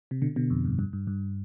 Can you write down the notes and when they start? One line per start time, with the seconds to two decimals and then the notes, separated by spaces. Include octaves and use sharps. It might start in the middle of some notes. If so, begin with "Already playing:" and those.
0.11 C3
0.22 B2 D3
0.36 B2 D3
0.50 F2
0.65 G2
0.79 G2
0.93 G2
1.07 G2